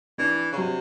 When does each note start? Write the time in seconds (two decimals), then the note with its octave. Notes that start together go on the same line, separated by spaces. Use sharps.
0.18 E3 D4
0.52 C#3
0.57 C3 F#3